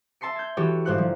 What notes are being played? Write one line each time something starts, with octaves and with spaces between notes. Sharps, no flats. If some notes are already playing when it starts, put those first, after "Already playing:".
E5 A5 C6 C7 C#7
G6 G#6
E3 F#4 G4 A4 C#5
G1 G#2 C5 F5 F#6 C#7
F3